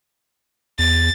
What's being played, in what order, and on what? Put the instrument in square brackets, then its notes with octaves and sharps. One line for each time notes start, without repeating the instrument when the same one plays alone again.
[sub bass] E2 [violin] A6